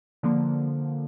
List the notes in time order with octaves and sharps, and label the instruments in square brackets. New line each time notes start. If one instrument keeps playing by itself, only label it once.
[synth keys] D3 F3 A#3